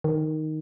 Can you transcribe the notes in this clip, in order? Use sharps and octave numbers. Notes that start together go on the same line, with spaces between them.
D#3